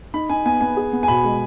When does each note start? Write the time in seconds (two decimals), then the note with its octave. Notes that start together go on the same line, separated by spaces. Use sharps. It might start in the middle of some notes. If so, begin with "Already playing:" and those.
0.14 D#4 B5
0.30 D#4 G#5
0.45 B3 G#5
0.61 B3 G#5
0.77 G#4
0.93 B3
1.03 G#5
1.08 B2 B5
1.24 G#3